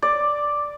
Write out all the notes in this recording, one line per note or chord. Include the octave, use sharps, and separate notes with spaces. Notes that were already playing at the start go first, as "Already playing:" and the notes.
D5